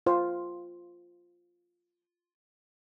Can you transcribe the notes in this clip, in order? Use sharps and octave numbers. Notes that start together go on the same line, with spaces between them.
F4 C5